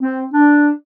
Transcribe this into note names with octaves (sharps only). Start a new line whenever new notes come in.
C4
D4